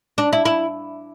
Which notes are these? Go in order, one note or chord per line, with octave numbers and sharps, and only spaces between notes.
D4
E4
E4